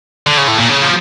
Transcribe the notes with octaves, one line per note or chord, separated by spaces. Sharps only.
D3
C#3
A2
A#2
C#3
F3